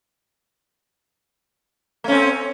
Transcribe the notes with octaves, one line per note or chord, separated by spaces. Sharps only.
A3 C4 C#4